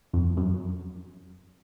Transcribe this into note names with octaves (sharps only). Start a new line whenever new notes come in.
F2
F#2